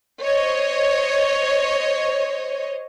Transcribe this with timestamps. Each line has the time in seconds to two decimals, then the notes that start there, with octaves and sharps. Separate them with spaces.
0.22 C5 C#5 D#5